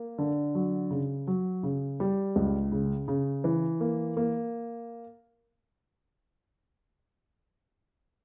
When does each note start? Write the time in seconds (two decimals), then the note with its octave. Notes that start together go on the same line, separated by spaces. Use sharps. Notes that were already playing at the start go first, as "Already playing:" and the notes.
Already playing: A#3
0.18 D3
0.55 F#3
0.90 C#3
1.27 F#3
1.63 C#3
2.00 G3
2.36 C#2
2.72 C#3
3.08 C#3
3.44 E3
3.81 A#3
4.17 A#3